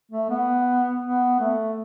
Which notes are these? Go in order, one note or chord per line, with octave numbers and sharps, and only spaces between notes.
A3
B3
B3
A3